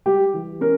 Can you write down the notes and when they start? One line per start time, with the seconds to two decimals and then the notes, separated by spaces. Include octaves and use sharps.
0.06 G3 G4
0.34 E3
0.61 C#4 A#4